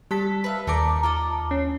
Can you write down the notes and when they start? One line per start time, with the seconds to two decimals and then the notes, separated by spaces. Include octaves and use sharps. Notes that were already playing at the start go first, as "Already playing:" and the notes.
0.11 G3 A4 A5 B6
0.44 B4 E5 F5
0.67 D#2 D#4 A#4 D5 A5 D6
1.03 F4 A4 D#5
1.51 C#4